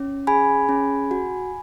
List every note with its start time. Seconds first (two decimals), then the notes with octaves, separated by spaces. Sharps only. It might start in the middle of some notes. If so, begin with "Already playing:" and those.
Already playing: C#4
0.27 G#4 G#5 B5
0.69 C#4
1.11 F#4